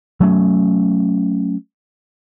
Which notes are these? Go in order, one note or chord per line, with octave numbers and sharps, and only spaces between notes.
F#3 A3 C#4